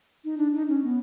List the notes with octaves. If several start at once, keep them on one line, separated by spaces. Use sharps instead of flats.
D#4
D4
D#4
C#4
B3